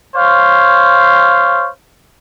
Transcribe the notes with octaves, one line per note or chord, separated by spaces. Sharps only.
C5 C#5 F5